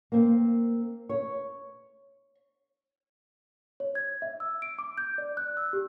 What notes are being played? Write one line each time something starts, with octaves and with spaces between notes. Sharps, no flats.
A#3 C4
C#5
C#5
G#6
E5
E6
D7
D6
G6
D5
F#6
E6
G4